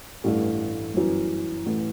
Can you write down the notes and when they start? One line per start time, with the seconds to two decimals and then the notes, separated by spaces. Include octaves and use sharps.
0.24 A1 G2 E3 A3
0.94 G1 F#2 E3
1.66 A1 A2 E3